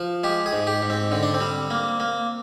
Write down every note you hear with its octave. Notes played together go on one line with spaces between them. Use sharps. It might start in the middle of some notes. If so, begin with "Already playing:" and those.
Already playing: F3
G#3 G4
G#4
G#2
G4
G#2
C4
D3 C4
D4
C4
G3
A#3
A#3